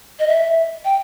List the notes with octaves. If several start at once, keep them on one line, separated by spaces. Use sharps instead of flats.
D#5
E5
G5